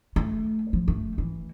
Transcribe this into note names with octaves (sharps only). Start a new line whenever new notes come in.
A3
F3
A3
E3